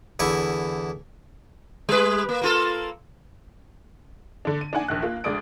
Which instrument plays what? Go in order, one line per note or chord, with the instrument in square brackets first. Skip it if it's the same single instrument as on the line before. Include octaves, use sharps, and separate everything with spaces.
[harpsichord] E2 D3 E4 C#6
[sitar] G3 B4
A#3
A#3 F4 A4
[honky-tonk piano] D3 D4
D#7
D4 D#4 F#5 G#5
A#1 D#2 F#6
A#3 F4
D2 G#3 D5 D#6 D7